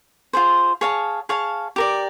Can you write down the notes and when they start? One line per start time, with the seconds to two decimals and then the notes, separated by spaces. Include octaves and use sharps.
0.33 F4 G#4 C5
0.81 G#4 C#5 F5 A5
1.29 G#4 C#5 F5 A5
1.76 G4 A#4 D5